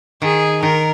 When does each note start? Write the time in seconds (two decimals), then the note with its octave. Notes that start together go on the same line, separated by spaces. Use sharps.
0.22 D#3 G#4
0.62 D#3 A#4